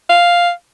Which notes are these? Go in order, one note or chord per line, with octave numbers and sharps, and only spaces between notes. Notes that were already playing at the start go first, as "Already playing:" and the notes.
F5